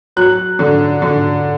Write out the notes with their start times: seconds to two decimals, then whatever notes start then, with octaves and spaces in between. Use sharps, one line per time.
0.16 F#3 F#6
0.59 D3
1.02 D3